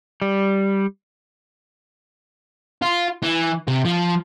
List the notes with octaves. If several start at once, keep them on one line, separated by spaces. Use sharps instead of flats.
G3
F4
E3
C3
F3